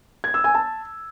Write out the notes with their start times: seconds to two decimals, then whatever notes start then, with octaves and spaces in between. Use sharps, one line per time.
0.24 G#6
0.34 E6
0.44 G#5
0.54 A5